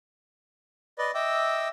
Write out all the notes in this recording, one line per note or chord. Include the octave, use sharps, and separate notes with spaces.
B4 D5 D#5
D#5 E5 G5 D6 E6